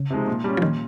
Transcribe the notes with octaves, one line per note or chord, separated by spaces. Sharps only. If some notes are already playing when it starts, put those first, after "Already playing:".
Already playing: C#3
C3 F3 G#3 D#4
A#2
G3 C#4
F3
A#2 D#3